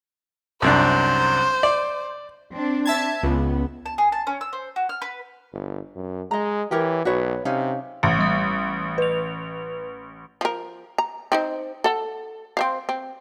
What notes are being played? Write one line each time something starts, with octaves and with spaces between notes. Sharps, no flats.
C2 F#2 D4 C5
D5
C4 D4
E5 A5 G#6
C#2 B3
A5
G#4
A5
C#4
E6
C5
F#4
F6
B4
G1
F#2
G#3 D#5 A#5
E3 G4 A#4 C#5
B1 F#4 B4 C#5
C3 C#4 D#4 F5
A1
G3 D#6
B4 F7
F3 A#4
A#5
C4 D#4 C5
A4 F#5
C4 C5 F5
C4